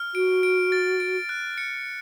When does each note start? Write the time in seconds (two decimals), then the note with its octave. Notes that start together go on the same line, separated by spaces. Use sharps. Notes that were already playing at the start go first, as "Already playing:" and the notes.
Already playing: F6
0.15 F#4 D7
0.43 D7
0.72 A6
1.00 D7
1.29 F#6
1.58 C#7